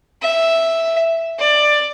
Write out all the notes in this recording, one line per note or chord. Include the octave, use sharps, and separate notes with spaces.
E5
D5